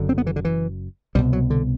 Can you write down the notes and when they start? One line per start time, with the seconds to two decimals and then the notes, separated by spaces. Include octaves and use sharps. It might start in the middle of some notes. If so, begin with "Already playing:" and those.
Already playing: F#1 F#2 D3
0.09 C4
0.18 B3
0.27 E3
0.36 D3
0.45 E3
1.15 C2 G3
1.18 B2
1.33 F#3
1.50 D3